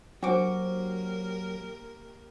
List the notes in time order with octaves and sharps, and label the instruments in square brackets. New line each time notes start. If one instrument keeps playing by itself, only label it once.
[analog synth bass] F#3 [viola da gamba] A#3 G4 A#4 [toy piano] D4 C5 [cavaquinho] F#4 D6